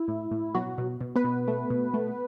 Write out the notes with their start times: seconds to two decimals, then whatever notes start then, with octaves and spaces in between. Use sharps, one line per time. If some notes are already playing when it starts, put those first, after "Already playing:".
Already playing: E4
0.08 A2
0.31 A2
0.55 B2 F#3 F#4
0.78 B2
1.01 B2
1.16 B3 B4
1.24 B2
1.48 A3
1.70 B2
1.94 A3